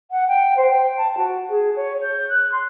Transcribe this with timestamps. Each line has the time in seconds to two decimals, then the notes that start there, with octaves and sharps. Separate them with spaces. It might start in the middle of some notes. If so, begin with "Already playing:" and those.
0.10 F#5
0.27 G5
0.56 C5
0.69 G5
0.96 A5
1.17 F#4
1.49 G#4
1.75 C#5
2.01 G6
2.29 F#6
2.51 C6